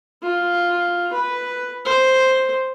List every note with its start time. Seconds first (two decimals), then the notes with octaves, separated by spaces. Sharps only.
0.22 F4
1.13 B4
1.85 C5